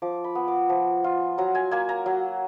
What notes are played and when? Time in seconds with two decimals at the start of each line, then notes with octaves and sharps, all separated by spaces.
0.02 F3 D6
0.24 B5
0.35 B3
0.48 D6
0.69 F3
1.04 F4
1.38 F#3 A#5
1.55 G#5
1.71 A#3 G#5
1.89 A#5
2.06 F#3